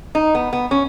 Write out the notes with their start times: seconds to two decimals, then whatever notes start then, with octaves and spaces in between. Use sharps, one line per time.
0.15 D#4
0.35 B3
0.53 B3
0.71 C#4